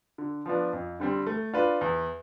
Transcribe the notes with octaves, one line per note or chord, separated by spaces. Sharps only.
D3
F3 B3 D4
F2
D3 G3 C4
A3
D4 F4 B4
E2